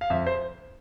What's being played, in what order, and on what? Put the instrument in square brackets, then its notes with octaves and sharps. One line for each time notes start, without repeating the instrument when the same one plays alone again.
[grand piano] F5
F2 E5
C5